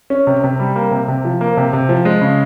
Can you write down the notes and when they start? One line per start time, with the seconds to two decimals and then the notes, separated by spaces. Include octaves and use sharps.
0.10 C#4
0.27 C3
0.44 C3
0.59 G3
0.76 A#3
0.91 C3
1.08 C3
1.25 F3
1.41 A#3
1.57 C3
1.73 C3
1.89 F3
2.05 G#3
2.21 C#3